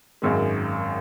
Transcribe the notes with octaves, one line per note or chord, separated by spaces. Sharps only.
G#1 F#2 D#3 G#3